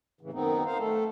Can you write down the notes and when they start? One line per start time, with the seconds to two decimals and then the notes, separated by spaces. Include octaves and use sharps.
0.21 A2 C#3 E3
0.33 F#2 D#3 B3 C4 D#4
0.65 D#4 C5 F5
0.79 A3 A4